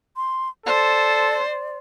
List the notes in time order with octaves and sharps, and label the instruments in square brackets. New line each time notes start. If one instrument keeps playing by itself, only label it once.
[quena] C6
[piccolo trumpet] A4 [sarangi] C5 [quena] D5